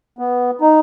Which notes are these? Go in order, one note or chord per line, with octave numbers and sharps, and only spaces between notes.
B3
D#4